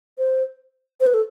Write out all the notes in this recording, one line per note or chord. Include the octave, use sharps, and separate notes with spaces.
C5
C5
B4
A4